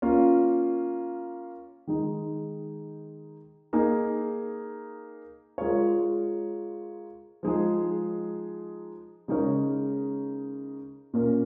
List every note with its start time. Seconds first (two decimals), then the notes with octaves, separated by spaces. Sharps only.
0.02 A#3 C#4 F4
1.87 D#3 G#3 D#4
3.73 A#3 D#4 G#4
5.58 G#3 F4 A#4 C#5
7.43 F3 G#3 D#4 G#4
9.28 C#3 G#3 D#4 A#4 C#5
11.13 A#2 A#3 C#4 A#4